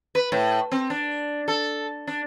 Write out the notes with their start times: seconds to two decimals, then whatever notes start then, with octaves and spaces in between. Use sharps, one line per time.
0.15 B4
0.32 A2
0.72 C4
0.90 D4
1.48 A4
2.07 D4